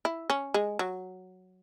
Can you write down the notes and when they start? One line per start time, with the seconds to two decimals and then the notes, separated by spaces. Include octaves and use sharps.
0.05 E4
0.30 C#4
0.54 G#3
0.79 F#3